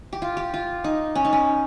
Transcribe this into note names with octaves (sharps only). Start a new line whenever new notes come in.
G4
F4
G4
F4
D#4
C#4
D#4
C#4